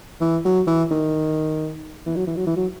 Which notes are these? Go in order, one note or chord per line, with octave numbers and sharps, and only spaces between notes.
E3
F#3
E3
D#3
E3
F#3
E3
F#3
E3
F#3